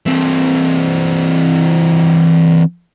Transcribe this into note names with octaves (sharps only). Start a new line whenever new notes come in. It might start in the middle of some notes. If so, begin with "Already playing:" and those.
E3 C4